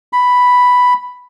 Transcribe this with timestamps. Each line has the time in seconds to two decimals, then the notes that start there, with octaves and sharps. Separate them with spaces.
0.13 B5